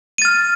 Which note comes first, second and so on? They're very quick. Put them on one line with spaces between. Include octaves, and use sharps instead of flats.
D#7 A6 F6